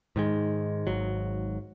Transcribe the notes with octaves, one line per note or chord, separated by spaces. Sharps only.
G#2 D#3 G#3
G#1 G#2 F#3